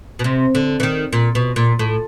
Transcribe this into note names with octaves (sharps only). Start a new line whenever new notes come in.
B2
C3
D3
E3
D#3
A#2
B2
A#2
A2